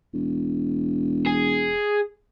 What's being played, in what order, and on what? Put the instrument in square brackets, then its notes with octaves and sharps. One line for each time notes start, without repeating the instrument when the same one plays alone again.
[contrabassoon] E1
[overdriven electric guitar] G#4